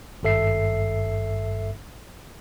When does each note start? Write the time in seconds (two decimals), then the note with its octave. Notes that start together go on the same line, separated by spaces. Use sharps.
0.23 G#1 G2 A4 E5 C7